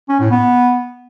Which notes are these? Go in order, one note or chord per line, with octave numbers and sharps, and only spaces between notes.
C#4
A2
B3